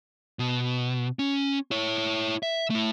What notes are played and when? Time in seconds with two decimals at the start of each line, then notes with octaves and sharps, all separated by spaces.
0.39 B2
1.19 C#4
1.71 E4 C#5
2.43 E5
2.70 A3 E4